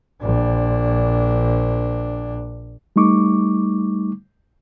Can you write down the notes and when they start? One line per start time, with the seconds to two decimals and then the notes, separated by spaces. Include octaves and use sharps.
0.22 A#1 D4
2.96 G3 A3 D#4 C#6 D6